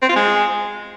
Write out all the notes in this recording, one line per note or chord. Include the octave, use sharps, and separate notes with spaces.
C4
F4
G#3